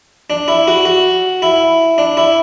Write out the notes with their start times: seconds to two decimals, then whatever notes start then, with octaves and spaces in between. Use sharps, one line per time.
0.30 D4
0.48 E4
0.68 F#4
0.85 F#4
1.42 E4
1.98 D4
2.17 E4